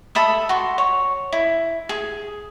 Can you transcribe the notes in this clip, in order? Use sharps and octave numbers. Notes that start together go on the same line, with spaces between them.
A4 E5 B5 D#6
F#4 C6
C#5
E4
G#4